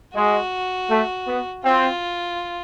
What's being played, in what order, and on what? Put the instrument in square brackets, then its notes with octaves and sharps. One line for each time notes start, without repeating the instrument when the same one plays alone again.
[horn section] G#3 [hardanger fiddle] F#4
[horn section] A3
B3
[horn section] C4 [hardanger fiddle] F4